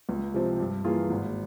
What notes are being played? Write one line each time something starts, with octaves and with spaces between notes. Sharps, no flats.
C#2
C3 F3 C4
G2
E3 A#3 F4 G#4
G#1